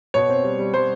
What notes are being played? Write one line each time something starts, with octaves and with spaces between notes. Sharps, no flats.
B2 C#5
C4
G3
G3
G3 C5